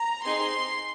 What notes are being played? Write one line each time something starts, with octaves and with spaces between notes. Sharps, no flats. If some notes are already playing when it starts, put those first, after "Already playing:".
Already playing: A#5
C4 D#4 G#4 C6